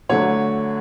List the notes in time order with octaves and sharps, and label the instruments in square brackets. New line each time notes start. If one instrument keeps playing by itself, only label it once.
[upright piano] D3 F#3 A3 C#5